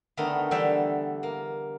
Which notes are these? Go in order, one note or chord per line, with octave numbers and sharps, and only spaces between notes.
D3 D#3 A3 B3 D#4
D3 E3 G3 E5 G5
A#3